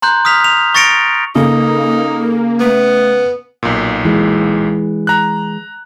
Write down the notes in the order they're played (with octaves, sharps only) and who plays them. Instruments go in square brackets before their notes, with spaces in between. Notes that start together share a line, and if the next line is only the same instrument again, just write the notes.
[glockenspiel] A#5 C6 F#6 G6
D#6 F6 B6 F7
F7
C#6 A6 A#6 C#7 D7 F7
[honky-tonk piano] C#3 [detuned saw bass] A#3 [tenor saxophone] D#4 [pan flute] A4
[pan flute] A3 [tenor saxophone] B3
[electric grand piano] B1 A#2
[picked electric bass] E3 G#3
[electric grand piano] A#5 F#6